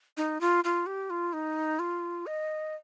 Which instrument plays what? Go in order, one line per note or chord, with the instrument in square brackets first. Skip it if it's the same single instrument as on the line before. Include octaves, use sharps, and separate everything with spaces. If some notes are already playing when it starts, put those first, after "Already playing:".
[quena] D#4
F4
F4
G4
F4
D#4
F4
D#5